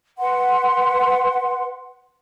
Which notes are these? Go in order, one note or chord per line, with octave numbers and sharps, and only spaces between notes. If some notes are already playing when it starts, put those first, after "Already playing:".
B4 F#5 C6